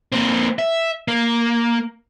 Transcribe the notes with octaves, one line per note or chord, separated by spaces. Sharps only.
A#3 C4
E5
A#3